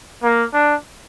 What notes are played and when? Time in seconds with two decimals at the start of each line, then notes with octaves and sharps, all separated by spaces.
0.23 A#3
0.54 D4